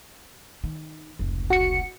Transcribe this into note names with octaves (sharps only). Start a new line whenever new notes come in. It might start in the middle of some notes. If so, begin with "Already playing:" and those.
D#3
F1 C#2
F#4 C#7